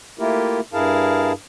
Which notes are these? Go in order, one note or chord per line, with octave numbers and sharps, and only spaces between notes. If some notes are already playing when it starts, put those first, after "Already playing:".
A3 A#3 E4 F4 G4 A#4
G2 E4 G#4 A#4 F5 A5